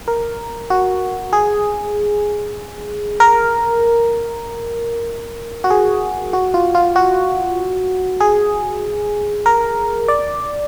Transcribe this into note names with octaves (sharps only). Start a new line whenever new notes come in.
A#4
F#4
G#4
A#4
F#4
G#4
F#4
F4
F4
F#4
G#4
A#4
D5